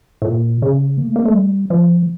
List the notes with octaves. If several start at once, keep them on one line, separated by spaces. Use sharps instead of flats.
A2
A#2
C#3
A#3
A3
A#3
A3
G3
F3